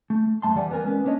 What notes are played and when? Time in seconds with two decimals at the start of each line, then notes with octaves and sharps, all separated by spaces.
0.10 A3
0.42 F#2 F3 A3 A5 C6
0.55 F2 E3 G3 D5 F#5 G#5
0.71 B3 C4 A#4 G#5
0.85 G#3 C#4 B4
1.04 A#3 B3 C#4 D4 C#5 D#5